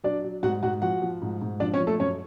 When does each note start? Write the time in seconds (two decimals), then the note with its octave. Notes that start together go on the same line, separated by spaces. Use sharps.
0.04 F#3 D4 D5
0.24 F#3
0.43 G#2 F#4 F#5
0.62 G#2 F#4 F#5
0.82 F3 F#4 F#5
1.02 F3
1.22 G#2
1.42 G#2
1.60 F3 D4 D5
1.74 C#4 C#5
1.80 F3
1.87 A3 A4
2.00 F#2 C#4 C#5